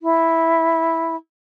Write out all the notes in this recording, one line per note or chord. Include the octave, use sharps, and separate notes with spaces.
E4